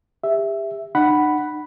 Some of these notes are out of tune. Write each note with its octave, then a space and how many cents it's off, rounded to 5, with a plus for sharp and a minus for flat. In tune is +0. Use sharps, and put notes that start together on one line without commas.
G4 +35 E5 +0
D#4 -45 F#5 +10 B5 +0